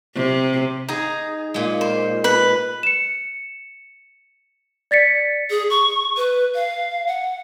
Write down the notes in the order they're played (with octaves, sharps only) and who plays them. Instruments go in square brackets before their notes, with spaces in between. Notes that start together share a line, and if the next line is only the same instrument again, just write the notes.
[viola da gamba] C3
[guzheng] D#4 G#4 [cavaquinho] A#5
[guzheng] A#2 G#3
[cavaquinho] C5
B4
[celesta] C#7 E7
D5 A6 B6 C#7
[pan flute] G#4
C#6
B4
F5
F#5